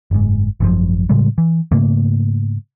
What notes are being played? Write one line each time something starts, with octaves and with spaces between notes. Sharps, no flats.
F#1 G#2
G#1 F#2 D3 F3
A2 C#3 G3 G#3
E3
G#2 C#3 A3 A#3